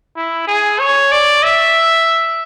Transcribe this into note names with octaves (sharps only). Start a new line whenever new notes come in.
E4
G#4
C#5
D5
E5